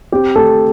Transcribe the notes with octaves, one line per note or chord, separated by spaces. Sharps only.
C4 G4
A3 A4